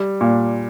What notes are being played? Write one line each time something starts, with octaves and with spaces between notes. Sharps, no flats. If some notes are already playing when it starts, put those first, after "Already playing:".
Already playing: G3
A#2